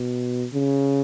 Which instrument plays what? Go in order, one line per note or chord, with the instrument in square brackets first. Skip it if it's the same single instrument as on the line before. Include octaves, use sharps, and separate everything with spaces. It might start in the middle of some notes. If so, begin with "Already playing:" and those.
Already playing: [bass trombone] B2
C#3